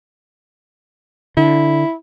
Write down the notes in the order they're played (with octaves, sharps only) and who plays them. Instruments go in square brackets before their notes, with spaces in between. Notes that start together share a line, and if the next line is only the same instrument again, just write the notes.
[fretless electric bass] D3 [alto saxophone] E4